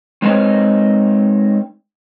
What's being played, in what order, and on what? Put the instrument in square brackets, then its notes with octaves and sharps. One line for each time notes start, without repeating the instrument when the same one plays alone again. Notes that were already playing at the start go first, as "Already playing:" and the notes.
[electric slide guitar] G#3 C4 D#4 B4 C#5 G#5